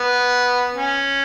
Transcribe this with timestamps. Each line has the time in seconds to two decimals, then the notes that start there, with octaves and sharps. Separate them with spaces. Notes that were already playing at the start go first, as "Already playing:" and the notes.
Already playing: B3
0.75 C#4